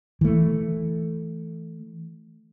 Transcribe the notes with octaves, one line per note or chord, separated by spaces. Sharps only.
E3 A3